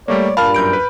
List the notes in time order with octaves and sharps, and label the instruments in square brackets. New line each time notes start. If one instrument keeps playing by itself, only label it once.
[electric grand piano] G3 A3 A#3 [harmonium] C#5 D5
[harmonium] G2 [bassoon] A#2 [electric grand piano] F5 A5 F6 [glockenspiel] B5
[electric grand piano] F#2 G6 D7
B4